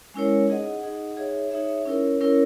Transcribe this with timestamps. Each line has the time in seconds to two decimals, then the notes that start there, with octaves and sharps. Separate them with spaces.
0.14 G#3 C#4 E4 A#4 C#5
0.48 D#4 G#4 D#5 F#5
0.83 D#4 G#4 D#5 F#5
1.17 D#4 G#4 C#5 E5
1.51 D#4 G#4 C#5 E5
1.85 C#4 E4 A#4 C#5
2.21 C#4 E4 A#4 C#5